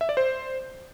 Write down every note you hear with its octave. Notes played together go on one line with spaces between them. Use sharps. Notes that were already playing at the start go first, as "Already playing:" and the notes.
E5
D5
C5